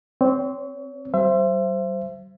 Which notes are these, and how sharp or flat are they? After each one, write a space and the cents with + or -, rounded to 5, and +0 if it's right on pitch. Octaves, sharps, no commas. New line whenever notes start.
C4 -10 C#5 +30
G3 -45 C5 +0 E5 +35